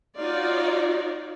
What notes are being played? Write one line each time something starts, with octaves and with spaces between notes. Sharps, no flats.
D#4 F4 F#4 C#5 D5